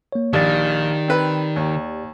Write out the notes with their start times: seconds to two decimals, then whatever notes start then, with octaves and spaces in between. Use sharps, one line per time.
0.12 A#3 C#5
0.33 A#1 D#3 G4 D5 A6
1.08 C4 B4
1.56 D#2